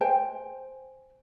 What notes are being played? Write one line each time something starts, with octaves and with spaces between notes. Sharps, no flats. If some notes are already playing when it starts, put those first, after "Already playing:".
C5 G5 G#5